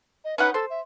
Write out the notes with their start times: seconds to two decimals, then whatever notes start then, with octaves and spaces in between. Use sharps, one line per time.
0.25 D#5
0.38 C#4 D#4 B4 F#5
0.54 A4 C5
0.70 E5